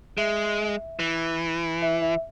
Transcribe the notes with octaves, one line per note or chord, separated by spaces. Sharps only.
G#3 E5
E3
E5
E5